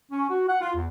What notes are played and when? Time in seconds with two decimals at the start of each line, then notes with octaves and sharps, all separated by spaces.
0.12 C#4
0.30 F#4
0.48 F#5
0.61 F4
0.75 E2